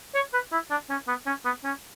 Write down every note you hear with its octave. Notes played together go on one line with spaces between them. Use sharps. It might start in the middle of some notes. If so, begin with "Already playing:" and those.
C#5
B4
E4
D4
C#4
B3
C#4
B3
C#4